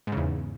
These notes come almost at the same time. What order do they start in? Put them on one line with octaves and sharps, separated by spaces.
G#2 C#3 E2